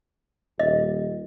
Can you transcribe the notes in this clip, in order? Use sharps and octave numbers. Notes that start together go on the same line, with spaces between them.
D#1 D#5